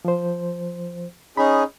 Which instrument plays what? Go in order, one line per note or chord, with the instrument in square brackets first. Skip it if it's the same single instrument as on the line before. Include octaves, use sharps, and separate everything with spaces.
[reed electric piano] F3 C5
[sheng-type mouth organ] C#4 D#4 G#4 [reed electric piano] B5